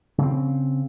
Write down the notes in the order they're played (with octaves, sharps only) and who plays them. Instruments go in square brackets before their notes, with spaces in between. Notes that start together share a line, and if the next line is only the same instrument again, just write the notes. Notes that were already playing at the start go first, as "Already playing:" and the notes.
[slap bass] C#3 C4